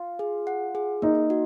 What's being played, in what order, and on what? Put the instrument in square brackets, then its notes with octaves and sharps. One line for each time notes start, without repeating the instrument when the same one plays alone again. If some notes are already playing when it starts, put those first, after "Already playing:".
Already playing: [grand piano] F4
[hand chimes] G#4
F#5
G#4
[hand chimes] A#3 [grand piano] D#4
[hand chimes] F#4